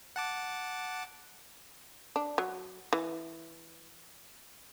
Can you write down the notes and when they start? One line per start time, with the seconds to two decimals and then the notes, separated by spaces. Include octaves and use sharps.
0.16 F#5 A5 D6
2.16 D4
2.38 F#3
2.93 E3